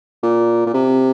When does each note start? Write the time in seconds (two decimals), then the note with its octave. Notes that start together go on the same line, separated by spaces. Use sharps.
0.23 A#2
0.67 A#2
0.74 C3